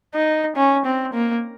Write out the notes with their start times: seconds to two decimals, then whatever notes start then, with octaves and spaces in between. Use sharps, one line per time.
0.14 D#4
0.56 C#4
0.85 C4
1.13 A#3